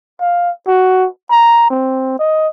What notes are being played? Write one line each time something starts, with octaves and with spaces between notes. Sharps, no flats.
F5
F#4
A#5
C4
D#5